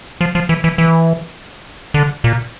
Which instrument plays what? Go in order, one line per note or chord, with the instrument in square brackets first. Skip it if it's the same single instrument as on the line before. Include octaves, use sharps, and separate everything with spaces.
[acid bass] F3
F3
E3
E3
E3
D3
A#2